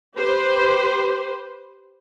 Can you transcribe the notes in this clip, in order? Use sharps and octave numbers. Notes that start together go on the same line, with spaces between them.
G4 B4 C5